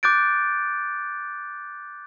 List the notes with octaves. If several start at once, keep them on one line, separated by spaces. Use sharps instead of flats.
D6 F#6 G6 A6 D7